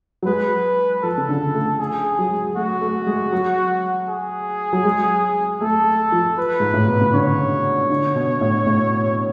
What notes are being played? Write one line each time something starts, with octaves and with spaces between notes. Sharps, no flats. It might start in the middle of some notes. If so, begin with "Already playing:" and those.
F#3
G#3 B4
F3 A4
C#3
D3
A3
G#4
F#3
G#3
A3 F#4
A3
G#3
F#3
G#4
F#3
G#3
A3 A4
F3
B4
G#2
A2
B2
C#3
D3 C#5
D3
B2
A2
A2